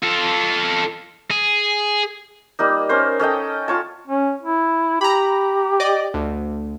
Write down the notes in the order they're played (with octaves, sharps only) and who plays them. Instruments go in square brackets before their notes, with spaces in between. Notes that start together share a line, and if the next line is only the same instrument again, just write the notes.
[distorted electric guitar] F4 A4
G#4
[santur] G3 A#3 D#4
C#4 A#4 C5
C#4 A4 D#5 G5
F4 C#5 A5
[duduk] C#4
E4
[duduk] G4 [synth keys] A#5 B5
[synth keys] D5 D#5
D2